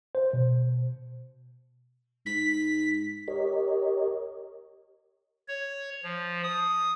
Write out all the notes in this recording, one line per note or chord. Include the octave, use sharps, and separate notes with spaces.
C5
B2
G#2 B6
G4 A#4 C#5 D#5
C#5
F3
D#6